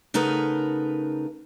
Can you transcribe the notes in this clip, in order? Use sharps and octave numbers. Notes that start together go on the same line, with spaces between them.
C#3 A3 D#4 A#4 B4 F#5